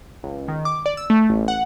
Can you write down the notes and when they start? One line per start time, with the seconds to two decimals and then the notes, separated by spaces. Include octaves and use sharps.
0.24 C#2
0.48 D#3
0.65 D6
0.86 D5
0.97 E6
1.10 A3
1.30 A1
1.48 F#5